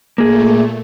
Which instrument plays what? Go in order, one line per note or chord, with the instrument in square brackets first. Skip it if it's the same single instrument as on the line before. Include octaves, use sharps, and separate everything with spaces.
[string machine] A#2 A3 [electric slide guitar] A#3 G#4